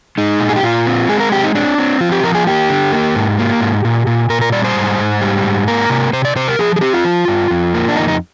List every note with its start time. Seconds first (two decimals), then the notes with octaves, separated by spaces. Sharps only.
0.18 G#3 D#4
0.40 A#2
0.49 G#4
0.56 G4
0.63 A#2 F4
0.87 C4
1.09 G#3 G#4
1.20 A#4
1.32 C4 G4
1.44 D#4
1.55 C4 D4
1.78 C4
2.01 F3 F4
2.12 G4
2.23 F3 A#4
2.35 G#4
2.46 A#3 G4
2.69 D3
2.92 A#3
3.15 G#2
3.39 A#3
3.61 G#2
3.85 A#2
4.07 A#2
4.30 A#2 A#4
4.41 A#4
4.52 G3 D5
4.64 C5
4.76 G#2
4.99 G#2
5.21 G3
5.44 G#2
5.68 A#3 A#4
5.90 C3
6.13 C3 C5
6.25 D5
6.36 C3 C5
6.48 A#4
6.59 F3 G#4
6.76 G#4
6.81 C4 G4
6.93 F4
7.05 F3
7.28 G2
7.51 F2
7.74 A#3
7.88 D4
7.96 F2 D#4
8.08 D#4